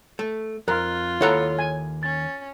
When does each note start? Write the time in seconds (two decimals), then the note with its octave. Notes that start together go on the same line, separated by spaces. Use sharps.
0.19 A3
0.68 F2 F4 A#4 F#6
1.21 D#2 E4 A4 C#5 F#5 A#5
1.59 G#5
2.03 C#4 A6